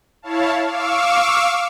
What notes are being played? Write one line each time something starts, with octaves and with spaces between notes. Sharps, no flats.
E4 C#5 F5 A5
F5 C#6 D6 E6